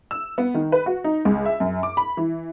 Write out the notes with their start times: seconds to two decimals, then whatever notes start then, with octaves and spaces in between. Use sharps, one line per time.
0.11 E6
0.38 B3
0.54 D#3
0.72 B4
0.86 F#4
1.04 D#4
1.25 C#2
1.45 E5
1.60 F#2
1.83 D6
1.97 B5
2.17 E3